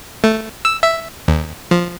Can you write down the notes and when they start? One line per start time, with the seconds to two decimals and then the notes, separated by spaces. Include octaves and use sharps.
0.24 A3
0.65 E6
0.83 E5
1.28 D#2
1.71 F3